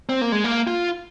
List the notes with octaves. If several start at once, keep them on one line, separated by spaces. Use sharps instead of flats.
C4
A#3
G#3
A#3
F4